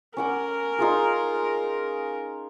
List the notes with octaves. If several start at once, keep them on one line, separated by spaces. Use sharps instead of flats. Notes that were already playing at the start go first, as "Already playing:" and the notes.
C#4 A#4 F#5 D6
D#4 F4 G#4